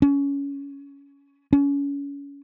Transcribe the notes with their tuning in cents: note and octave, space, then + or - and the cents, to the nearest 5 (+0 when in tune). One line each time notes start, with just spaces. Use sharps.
C#4 +20
C#4 +30